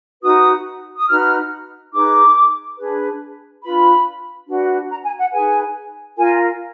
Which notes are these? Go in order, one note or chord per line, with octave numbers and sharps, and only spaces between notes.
D#4 F#4 B4 D#6
D#6
D#4 F#4 B4 F6
D#4 G#4 B4 D6
D4 G#4 B4
D4 F4 B4 B5
D4 F#4 B4
A#5
G#5
F#5
D#4 G#4 B4 G#5
F4 A#4 G#5